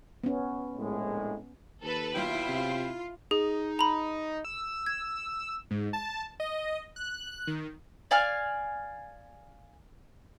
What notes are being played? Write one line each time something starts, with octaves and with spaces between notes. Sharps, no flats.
B3 C#4
A#1 A2 G#3
D#2 A4 B4
B2 F#3 E4 F4 G5
C3
D#4 G#4
A#5 B5
E6
G#6
G#2
A5
D#5
F#6
D#3
D5 F5 G#5 F6